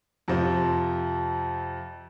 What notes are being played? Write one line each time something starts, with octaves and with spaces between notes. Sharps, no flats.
F2 C3 F3